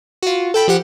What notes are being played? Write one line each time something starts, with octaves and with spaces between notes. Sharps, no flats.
F4 F#4
A4 G5 B5
F3 G4 F#5